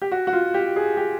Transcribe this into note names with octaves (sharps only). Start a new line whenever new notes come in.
G4
F#4
F#4
F4
G4
G#4
G4